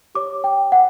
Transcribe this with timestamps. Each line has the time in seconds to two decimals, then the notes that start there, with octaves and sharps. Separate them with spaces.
0.15 G4 C#5 D6
0.44 G5
0.72 F#5